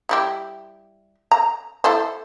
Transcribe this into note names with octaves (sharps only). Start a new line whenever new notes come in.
G3 E4 G4
A#5
E4 A4 C5